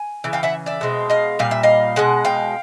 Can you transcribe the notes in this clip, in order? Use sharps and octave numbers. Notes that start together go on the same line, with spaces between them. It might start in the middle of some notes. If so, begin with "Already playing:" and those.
Already playing: G#5
C#3 E3
F5 G5
E5 F#5
D5 E5
B2 G#3 C4
D#5 F5
A#2 G3 F5
E5
D#5 F5
B2 G#3 F#5
F5 G5